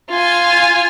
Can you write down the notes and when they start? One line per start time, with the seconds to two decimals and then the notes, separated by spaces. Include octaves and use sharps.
0.10 F4 G#5